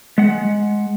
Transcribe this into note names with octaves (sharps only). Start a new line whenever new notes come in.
G#3 F#5